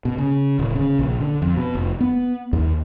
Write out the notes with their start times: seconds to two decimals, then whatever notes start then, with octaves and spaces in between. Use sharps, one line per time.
0.05 B2
0.18 C#3
0.59 D1
0.75 C#3
0.99 A#1
1.20 D3
1.42 F2
1.57 B2
1.75 F1
2.01 B3
2.53 D#2